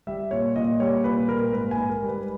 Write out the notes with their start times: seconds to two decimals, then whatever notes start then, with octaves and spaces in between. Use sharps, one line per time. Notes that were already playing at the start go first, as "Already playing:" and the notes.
0.07 G3 E5
0.31 A#2 C#5
0.56 A#2 D#5
0.80 G3 C#5
1.04 A#2 B4
1.29 A#2 A#4
1.53 G#2 B4
1.71 G#5
1.77 G#2
1.90 A#4
2.03 G3
2.08 B4